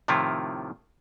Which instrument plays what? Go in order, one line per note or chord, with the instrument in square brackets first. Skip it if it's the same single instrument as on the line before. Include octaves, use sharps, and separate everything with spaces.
[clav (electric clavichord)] A2 C3 D#3 F3 E4 F4